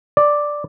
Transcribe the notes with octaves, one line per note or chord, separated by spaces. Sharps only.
D5